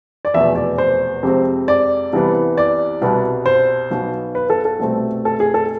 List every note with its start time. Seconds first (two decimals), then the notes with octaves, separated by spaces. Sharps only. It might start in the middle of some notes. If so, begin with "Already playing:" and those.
0.25 D5
0.34 F1 E2 B2 E5
0.55 D5
0.78 C5
1.23 F2 C3 G#3 C4
1.68 D5
2.13 C2 C3 E3 B3
2.58 D5
3.01 C2 B2 B3
3.46 C5
3.91 B1 B2 B3
4.35 B4
4.50 A4
4.65 A4
4.79 C2 B2 A3 C4
5.25 A4
5.40 G#4
5.54 A4